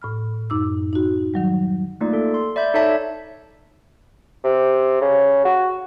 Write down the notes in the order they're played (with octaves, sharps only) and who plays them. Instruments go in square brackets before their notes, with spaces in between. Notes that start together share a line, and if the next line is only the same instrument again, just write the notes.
[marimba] A2 B5 F6
F#2 D#4 D6 E6
D#4 F#4
D#3 F#3 G3
[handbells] A3 A#3 D#4 F4 D5
A4
C6
D5 E5 B5 G6
D#4 A4 C#5 D5 E5 A5
[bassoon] C3
C#3
F#4